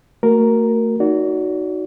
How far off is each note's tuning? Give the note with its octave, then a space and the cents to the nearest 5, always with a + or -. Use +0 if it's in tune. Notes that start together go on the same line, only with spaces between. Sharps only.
A3 +35 F#4 +0 A#4 +0
D#4 +0 F#4 +0 D5 -45